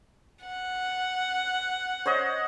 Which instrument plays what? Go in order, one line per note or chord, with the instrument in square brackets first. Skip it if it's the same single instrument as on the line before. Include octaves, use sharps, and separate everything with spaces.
[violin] F#5
[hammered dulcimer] C5 C#5 D#5